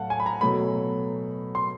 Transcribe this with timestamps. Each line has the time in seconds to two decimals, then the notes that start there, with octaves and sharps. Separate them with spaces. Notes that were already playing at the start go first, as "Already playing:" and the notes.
Already playing: A2 F#3 A3 F5 F#5 A5
0.10 G#5
0.20 B5
0.26 A#5
0.41 B2 F#3 A3 B5
1.55 C6